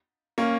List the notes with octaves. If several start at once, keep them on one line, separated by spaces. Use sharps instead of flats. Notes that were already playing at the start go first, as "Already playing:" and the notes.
A#3 C#4